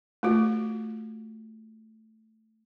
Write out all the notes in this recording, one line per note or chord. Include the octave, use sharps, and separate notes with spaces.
A3 F4 F#4